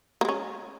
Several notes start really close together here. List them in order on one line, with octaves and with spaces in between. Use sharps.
A#3 G#3 C#4